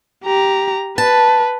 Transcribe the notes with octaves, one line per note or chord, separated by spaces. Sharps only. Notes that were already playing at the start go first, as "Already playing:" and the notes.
G4 A#5
B4 A5